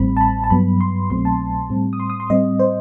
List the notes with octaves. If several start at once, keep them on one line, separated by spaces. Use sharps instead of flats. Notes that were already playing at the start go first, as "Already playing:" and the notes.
Already playing: A1 A2 G3 C4 B5
A5
B5
A5
G2 F#3 B3 B5
C6
C2 B2 F#3 A3 C4 C6
A5
A2 G3 C4
D#6
C6
D#6
C6
A2 G3 C4 D#5
C5